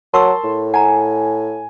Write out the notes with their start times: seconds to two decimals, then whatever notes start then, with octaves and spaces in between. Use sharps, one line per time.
0.14 F#3 A#4 A5 C6 C#6 E6
0.44 A2
0.74 F#5 G#5 A#5